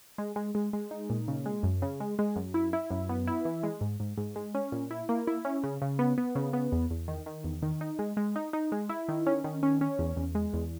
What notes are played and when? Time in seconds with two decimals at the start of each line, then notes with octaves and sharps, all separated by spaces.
0.18 G#3
0.36 G#3
0.55 G#3
0.73 G#3
0.91 D#4
1.10 A#2
1.28 C#3
1.46 G#3
1.63 F#2
1.82 C#3
2.00 G#3
2.19 G#3
2.36 F#2
2.54 E4
2.73 E4
2.91 F#2
3.09 B3
3.27 E4
3.45 E3
3.63 G#3
3.81 G#2
4.00 G#2
4.17 G#2
4.36 G#3
4.55 C#4
4.72 A#2
4.91 E4
5.09 A#3
5.27 E4
5.45 C#4
5.64 C#3
5.82 C#3
5.99 B3
6.18 B3
6.35 C#3
6.53 B3
6.72 E2
6.91 E2
7.08 D#3
7.26 D#3
7.44 E2
7.62 D#3
7.81 D#4
7.99 G#3
8.17 G#3
8.36 D#4
8.53 D#4
8.72 G#3
8.89 E4
9.08 D#3
9.27 C#4
9.44 D#3
9.63 C#4
9.81 C#4
9.99 E2
10.17 E2
10.35 G#3
10.53 E2